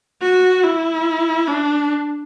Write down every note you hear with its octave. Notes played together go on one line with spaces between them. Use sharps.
F#4
E4
D4